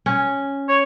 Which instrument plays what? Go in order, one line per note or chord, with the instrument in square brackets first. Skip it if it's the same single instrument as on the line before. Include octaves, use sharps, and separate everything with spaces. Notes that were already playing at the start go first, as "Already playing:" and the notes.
[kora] C#4
[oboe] C#5